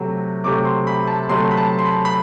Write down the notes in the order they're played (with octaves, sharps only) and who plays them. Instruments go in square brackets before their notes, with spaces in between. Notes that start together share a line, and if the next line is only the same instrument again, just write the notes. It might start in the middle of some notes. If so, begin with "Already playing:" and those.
Already playing: [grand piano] C3 F#3 A3
C3 F#3 A3 D6
C6
B5
A5
C3 F#3 A3 C6
B5
A5
C6
B5
B5